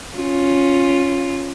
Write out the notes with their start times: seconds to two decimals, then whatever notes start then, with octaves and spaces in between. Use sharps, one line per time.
0.17 C#4 F4